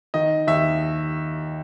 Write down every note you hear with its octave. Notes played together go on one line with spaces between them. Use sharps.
D#3 D#5
D#2 E5